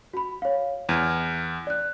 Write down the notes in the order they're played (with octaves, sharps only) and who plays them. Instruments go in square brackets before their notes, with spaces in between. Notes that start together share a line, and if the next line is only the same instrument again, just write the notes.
[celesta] F#4 B5
C#5 F5
[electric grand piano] E2 [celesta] F6 G#6 D#7
[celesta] D5 F#6